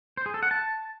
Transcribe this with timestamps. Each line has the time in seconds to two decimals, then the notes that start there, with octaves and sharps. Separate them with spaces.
0.17 C5
0.26 G#4
0.34 A4
0.43 F#5
0.51 A5